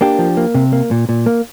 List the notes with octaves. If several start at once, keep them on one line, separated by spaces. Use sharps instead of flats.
A#3 D4 G4
F3
A#3
C3
A#3
A#2
A#2
A#3